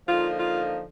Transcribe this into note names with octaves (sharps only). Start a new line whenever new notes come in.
D3 F3 A#3 D#4 F4
F4